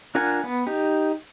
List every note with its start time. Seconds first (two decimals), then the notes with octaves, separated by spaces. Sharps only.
0.15 D4 F4 A#4 F#5 G#5
0.44 B3
0.67 D#4 G4